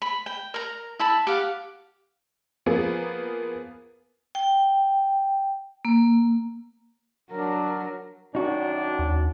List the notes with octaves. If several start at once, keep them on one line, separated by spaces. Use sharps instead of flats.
B5
G5
A#4 A#5
E4 A5 B5
G4 F5 F#5
F3 A#3 B3 G#4
G5
A#3
F#3 D4 A#4
F#2 D#3 D4 D#4 F#4
D#2